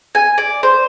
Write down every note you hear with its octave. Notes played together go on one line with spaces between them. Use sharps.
G#5
D5
C5